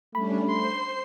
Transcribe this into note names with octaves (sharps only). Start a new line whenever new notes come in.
G3 A3 C#4 D4 B5
C5 C6 C7